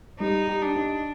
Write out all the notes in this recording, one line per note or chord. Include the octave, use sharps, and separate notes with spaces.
G3 D#4
G4
D4
D#4